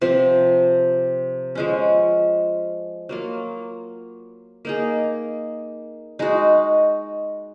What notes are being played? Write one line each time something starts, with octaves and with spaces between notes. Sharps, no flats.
C3 F3 C4
F3 G#3 C#4
F#3 A#3 F4
A#3 D#4 G#4
G#3 D#4 F#4